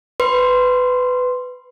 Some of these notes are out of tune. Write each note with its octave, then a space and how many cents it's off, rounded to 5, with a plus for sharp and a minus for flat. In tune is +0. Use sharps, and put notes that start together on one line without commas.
B4 +20 C6 +0